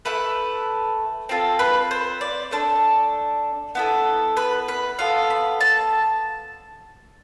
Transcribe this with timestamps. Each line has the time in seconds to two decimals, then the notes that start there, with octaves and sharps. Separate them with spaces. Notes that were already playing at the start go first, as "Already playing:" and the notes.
0.05 A3 E4 A4 B4
1.29 C4 F4 A4
1.59 B4
1.91 C5
2.21 D5
2.51 A3 D4 A4 C5
3.75 B3 E4 A4
4.37 B4
4.68 B4
4.99 B3 F4 A4 F5
5.30 B5
5.61 A5